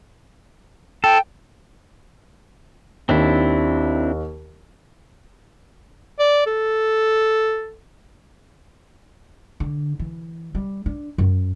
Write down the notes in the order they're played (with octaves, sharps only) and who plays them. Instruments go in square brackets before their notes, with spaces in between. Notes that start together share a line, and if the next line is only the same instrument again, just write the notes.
[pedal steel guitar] A4 [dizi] G5
[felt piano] D#2 [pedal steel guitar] C4 D4 E4
[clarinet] D5
A4
[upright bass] D3
E3
G3
D4
F#2